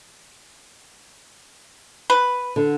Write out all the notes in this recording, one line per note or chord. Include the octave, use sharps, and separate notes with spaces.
B4
D3